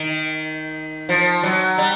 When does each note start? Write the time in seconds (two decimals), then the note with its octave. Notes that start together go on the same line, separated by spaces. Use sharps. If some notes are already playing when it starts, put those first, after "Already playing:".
Already playing: D#3
1.09 F3
1.43 F#3
1.78 G3